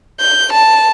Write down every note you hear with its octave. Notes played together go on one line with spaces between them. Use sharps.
G6
A5